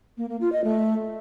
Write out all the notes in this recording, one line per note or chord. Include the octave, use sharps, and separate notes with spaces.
A#3
A#3
F4
D#5
A3